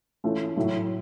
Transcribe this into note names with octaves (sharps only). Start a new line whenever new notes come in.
E3 A3 C#4 F4
A2 F#3 A3